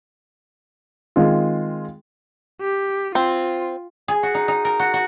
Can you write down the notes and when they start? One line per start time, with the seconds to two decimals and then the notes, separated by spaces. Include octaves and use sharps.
1.16 D#3 G#3 C4 F4
2.62 G4
3.15 C4 F4
4.08 G#4
4.23 F#4
4.35 D#4
4.48 D#4
4.65 A#4
4.79 F#4
4.94 F#4